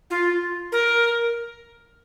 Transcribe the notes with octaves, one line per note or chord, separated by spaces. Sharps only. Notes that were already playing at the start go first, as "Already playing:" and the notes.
F4
A#4